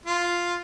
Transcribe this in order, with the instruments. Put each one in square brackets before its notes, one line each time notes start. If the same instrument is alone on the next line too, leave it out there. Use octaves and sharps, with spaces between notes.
[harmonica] F4